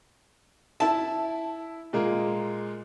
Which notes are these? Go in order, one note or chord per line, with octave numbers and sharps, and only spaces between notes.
E4 E5 A5
A#2 G#3 A#3